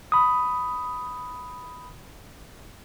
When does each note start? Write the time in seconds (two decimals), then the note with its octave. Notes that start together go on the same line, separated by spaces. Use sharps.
0.12 B5 D#6